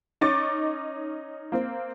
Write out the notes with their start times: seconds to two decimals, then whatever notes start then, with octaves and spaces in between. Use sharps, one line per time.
0.21 C#4 D#4 D#5 C#6 D6 A6
1.52 A#3 C4